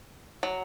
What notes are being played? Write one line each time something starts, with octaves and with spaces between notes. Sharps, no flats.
F#3